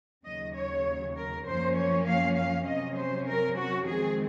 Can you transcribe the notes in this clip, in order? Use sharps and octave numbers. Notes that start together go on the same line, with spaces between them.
D#2 C#3 F#3 D#5
C#5
A#4
F#2 F3 A#3 C#4 C5
C#5
F5
F5
C3 F#3 C#4 D#5
C5
A#4
F#4
F2 D#3 G#3 C4 G#4